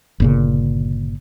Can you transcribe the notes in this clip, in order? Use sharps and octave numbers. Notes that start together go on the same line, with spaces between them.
G1 A#2 C#3